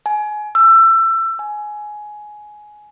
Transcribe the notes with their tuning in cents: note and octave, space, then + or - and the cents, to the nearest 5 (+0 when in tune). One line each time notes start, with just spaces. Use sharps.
G#5 +25
E6 +25
G#5 +15